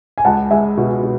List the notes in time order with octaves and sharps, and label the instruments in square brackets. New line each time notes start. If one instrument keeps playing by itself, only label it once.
[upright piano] G#5
[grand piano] C#2 [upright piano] F#5 A5
[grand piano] G#3 [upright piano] E5 G#5
[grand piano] B2
B2